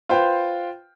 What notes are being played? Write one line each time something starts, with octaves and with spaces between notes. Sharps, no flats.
F4 B4 C5 F5 G5